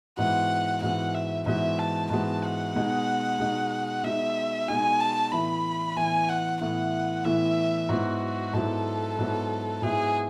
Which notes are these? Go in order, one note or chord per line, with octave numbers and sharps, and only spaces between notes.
G#2 E3 G#3 B3 F#4 F#5
G#2 E3 G#3 B3 F#4 F#5
E5
G#2 E3 G#3 B3 F#4 E5
A5
G#2 E3 G#3 B3 F#4 A5
F#5
B2 G#3 D#4 F#4
B2 G#3 D#4 F#4
B2 G#3 D#4 F#4 E5
B2 G#3 D#4 F#4 G#5
A5
A2 E3 B3 E4 B5
A2 E3 B3 E4 G#5
F#5
A2 E3 B3 E4 F#5
A2 E3 B3 E4 E5
G#2 F#3 B3 E4 F#4
G#2 F#3 B3 E4 A4
G#2 F#3 B3 E4
G#2 F#3 B3 E4 G#4